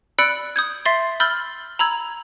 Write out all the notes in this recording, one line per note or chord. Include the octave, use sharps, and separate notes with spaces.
D5 B5 E6 F#6 C#7 D7
D#6 G6 G#6
E5 C6 A6 C7 G7
B5 E6 F6 G6 A6 G7
A#5 B5 E6 G#6